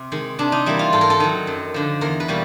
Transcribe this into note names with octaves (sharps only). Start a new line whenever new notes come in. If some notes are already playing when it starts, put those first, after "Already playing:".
Already playing: C3
D#3 G#3
C3 D4
D#4
E3 G3 A#3 E4
F4
G#2 A4
A#4
A4
D#3 F#3
F#2
D3 F3
E2 A#4
B4
B2 G3 A#3